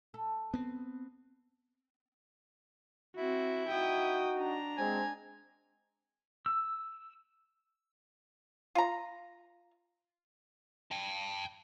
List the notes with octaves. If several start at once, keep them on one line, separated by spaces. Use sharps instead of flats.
A4
B3 C4
C4 E4 F#4
D#4 F#4 G5 D#6
D4 A#5
G#3 C4 G#5
E6
F4 A#5
G5 A5